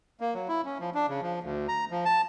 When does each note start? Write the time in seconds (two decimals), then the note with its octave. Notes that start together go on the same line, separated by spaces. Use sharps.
0.20 A#3
0.34 F#3
0.48 E4
0.65 C#4
0.80 F3
0.94 D4
1.09 C#3
1.22 F3
1.43 D2
1.68 A#5
1.91 F3
2.05 A5